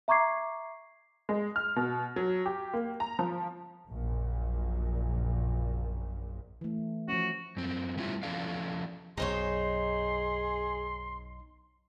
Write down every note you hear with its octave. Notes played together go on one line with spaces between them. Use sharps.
E5 A#5 C#6 D6 G#6 C7
G#3
F6
B2
F#3
G4
A#3
A#5
F3
A#1 F#2 A#2
E3 A3
F3 C#4 F#4
F#2 C4
G3 A3 B3 C#4 E4 F4
F3 C#4 A4 D5 F5
B1 F#2 D#4 G#4 C5 C#5 C6